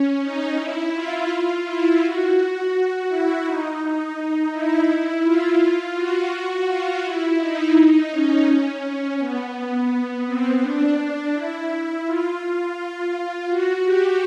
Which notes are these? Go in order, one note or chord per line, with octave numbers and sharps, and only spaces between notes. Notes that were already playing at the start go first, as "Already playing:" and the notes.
Already playing: C#4
D#4
E4
F4
E4
F#4
E4
D#4
E4
F4
F#4
F#4
F4
E4
D#4
C#4
B3
B3
C4
D4
E4
F4
F4
F#4
G4